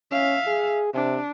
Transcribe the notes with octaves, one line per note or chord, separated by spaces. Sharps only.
C#4 E5 F5
G#4
C3 D4